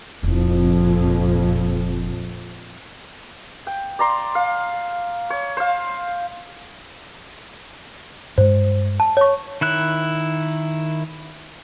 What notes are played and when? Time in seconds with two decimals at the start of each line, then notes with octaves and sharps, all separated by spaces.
0.23 F1 A#1 F2 E4
3.67 G5
3.99 D5 A#5 C6
4.35 F5
5.30 C#5
5.57 C5 F5
8.38 G2 G#3 C5
9.00 A5
9.17 C#5 C#6
9.61 D#3 E4 F#6